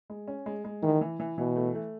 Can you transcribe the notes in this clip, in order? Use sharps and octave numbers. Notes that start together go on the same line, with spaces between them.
G#3
C#4
G#3
G#3
D#3 E3
E3
E3
B2 E3
A3
A3